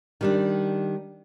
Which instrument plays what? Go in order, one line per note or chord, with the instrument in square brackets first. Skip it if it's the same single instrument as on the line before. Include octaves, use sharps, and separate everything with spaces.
[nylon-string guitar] D#3 G3 D4